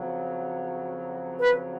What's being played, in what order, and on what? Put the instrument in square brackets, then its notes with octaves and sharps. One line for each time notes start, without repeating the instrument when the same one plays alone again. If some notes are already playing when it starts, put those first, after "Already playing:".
Already playing: [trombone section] F2 C#3 F#3
[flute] B4